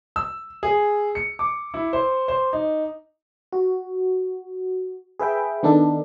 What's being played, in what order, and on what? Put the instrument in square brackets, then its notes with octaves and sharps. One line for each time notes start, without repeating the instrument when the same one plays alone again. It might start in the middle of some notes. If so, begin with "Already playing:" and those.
[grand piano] E6
G#4
C#7
D6
E4
C5
C5
D#4
[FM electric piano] F#4
G#4 B4 E5 G5
D#3 B3 D4 D#4 A4